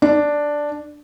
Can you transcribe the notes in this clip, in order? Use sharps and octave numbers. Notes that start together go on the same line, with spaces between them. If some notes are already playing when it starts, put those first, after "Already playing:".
D4